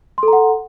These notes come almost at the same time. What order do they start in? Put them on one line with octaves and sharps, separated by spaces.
C6 A4 A#5 F#5